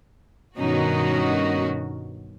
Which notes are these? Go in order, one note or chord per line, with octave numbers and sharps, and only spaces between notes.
G2 B2 D#3 C#4 D#4 F#4